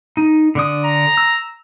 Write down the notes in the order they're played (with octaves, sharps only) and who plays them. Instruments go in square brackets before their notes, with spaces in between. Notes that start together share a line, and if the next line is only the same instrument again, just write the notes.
[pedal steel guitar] D#4
D3 D4 D#6
[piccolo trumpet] A#5
[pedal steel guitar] E6